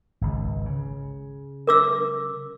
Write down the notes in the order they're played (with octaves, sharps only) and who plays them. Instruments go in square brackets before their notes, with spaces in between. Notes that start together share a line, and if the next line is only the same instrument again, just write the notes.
[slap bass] G#1 C#2
C#3
[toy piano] A#4 D6 E6